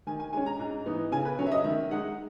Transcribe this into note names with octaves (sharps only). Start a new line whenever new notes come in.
D#3 G#5
G#5
G#3 C#4 G#5
A#5
G#2
E3 B3 D#4
C#3 G#5
B4
F#3 C#4 C#5
E5
D#5
D#3 E5
G#3 D#4 F#5